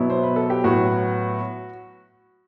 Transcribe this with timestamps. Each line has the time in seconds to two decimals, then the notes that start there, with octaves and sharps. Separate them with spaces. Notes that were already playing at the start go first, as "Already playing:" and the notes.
Already playing: B2 F#3 B3 E4
0.10 C5
0.23 B4
0.36 A4
0.50 G4
0.64 A2 F#3 B3 F#4